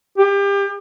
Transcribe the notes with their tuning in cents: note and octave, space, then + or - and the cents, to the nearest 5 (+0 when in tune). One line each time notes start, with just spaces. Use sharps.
G4 +30